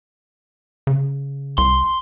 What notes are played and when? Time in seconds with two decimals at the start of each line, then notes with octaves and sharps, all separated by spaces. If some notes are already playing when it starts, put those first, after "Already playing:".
0.87 C#3
1.58 C2 C6